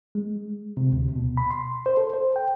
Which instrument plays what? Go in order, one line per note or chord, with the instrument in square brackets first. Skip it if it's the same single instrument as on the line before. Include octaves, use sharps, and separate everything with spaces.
[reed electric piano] G#3
C3
D2
B2
B5
C6
C5
A4
C5
G5